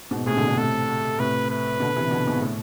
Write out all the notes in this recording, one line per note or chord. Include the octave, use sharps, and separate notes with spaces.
G#2 B2
A2 C3 G#4
B2 D3
B2 D3
A2 C3 A4
A2 C3 B4
B4
B2 D3
C3 E3
B2 D3
G#2 B2
A2